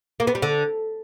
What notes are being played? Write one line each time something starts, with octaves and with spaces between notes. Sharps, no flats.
A#3
B3
G3
D3